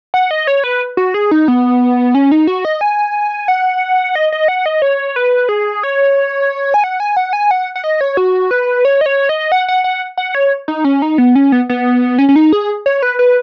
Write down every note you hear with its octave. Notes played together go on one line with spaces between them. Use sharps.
F#5
D#5
C#5
B4
F#4
G#4
D#4
B3
C#4
D#4
F#4
D#5
G#5
F#5
D#5
D#5
F#5
D#5
C#5
B4
G#4
C#5
G#5
F#5
G#5
F#5
G#5
F#5
F#5
D#5
C#5
F#4
B4
C#5
D#5
C#5
D#5
F#5
F#5
F#5
F#5
C#5
D#4
C#4
D#4
B3
C#4
B3
B3
C#4
C#4
D#4
G#4
C#5
B4
B4